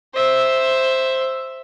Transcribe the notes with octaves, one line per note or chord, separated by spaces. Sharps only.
C5 E5